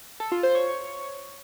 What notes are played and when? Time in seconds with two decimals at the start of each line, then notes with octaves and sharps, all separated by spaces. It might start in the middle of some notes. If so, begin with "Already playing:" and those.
0.20 A4
0.32 F4
0.43 C5
0.55 C#5